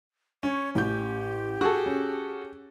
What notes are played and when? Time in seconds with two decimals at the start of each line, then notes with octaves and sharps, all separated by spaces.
0.43 C#4 C#5
0.75 A1 G4 G6
1.61 F#4 G#4 A4 C#6
1.86 C#4